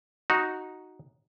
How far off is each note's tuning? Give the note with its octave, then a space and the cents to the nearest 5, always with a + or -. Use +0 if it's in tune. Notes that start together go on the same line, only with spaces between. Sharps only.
D#4 +0 F#4 +0